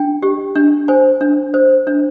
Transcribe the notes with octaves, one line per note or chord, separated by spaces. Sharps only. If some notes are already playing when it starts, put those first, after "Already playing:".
Already playing: D4 G5
G4
D4
C5 G#5
D4
C5
D4